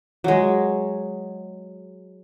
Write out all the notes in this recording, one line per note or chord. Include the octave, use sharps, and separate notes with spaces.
F#3 G#3